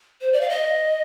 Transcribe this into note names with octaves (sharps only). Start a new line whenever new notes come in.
C5
D5
F5
D#5